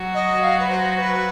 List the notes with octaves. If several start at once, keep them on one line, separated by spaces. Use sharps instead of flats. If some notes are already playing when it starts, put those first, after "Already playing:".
Already playing: F#3 F#4
D#5
F5
B4
C5
C5
B4